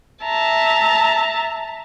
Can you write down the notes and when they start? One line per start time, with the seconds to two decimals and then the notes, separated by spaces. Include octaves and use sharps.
0.23 E5 A5 A#5